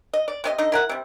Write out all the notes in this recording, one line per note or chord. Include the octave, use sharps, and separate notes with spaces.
D#5
D5
C3 C#4 D#5
D3 D#4 D#5
E4 A#4 F#5
C3 G3